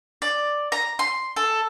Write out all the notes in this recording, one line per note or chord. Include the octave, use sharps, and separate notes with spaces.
D5
A#5
C6
A4